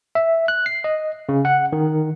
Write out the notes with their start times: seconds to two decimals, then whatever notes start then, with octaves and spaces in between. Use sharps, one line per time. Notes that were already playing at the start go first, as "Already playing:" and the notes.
0.15 E5
0.48 F#6
0.66 C7
0.84 D#5
1.29 C#3
1.45 F#5
1.73 D#3